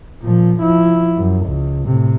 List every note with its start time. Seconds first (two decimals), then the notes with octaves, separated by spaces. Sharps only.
0.22 A#2 F3
0.60 F3 E4
1.16 F#2
1.46 C#2
1.87 A2 C3